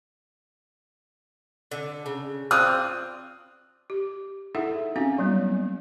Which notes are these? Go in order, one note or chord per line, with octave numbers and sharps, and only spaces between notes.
D3
C#3
C4 D4 F4 D#6 F6 F#6
G4
D#4 E4 G#4 A4 E5 F#5
C4 C#4 D#4 F#4 F5 G#5
F#3 G3 A#3 B3